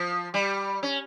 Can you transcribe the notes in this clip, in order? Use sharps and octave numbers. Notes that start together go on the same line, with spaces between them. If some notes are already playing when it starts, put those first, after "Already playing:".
Already playing: F3
G3
C#4